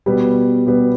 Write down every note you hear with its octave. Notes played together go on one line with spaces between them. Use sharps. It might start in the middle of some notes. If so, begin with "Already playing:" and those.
B2 G3 B3
B2 G3 B3